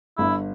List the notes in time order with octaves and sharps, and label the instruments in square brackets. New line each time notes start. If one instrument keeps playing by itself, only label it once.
[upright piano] G1 [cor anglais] E4